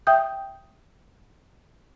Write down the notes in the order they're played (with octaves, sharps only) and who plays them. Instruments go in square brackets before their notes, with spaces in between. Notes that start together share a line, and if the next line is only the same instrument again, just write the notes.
[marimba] E5 G5 D#6 G6